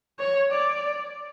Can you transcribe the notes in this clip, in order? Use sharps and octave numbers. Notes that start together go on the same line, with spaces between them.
C#5
D5